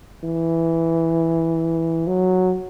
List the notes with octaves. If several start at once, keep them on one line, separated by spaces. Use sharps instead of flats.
E3
F#3